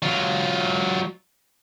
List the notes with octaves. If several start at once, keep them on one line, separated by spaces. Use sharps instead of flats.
F#3 F4